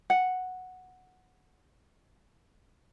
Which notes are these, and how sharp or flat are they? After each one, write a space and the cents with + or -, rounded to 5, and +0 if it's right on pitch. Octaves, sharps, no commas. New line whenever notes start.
F#5 -5